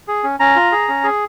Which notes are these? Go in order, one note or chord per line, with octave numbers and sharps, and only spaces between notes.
G#4
C#4
C#4 A#5
F4
G#4
C#4
G#4